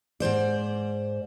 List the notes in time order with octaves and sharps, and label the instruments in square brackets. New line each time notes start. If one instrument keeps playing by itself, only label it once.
[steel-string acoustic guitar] G#2 C#3 C5 D5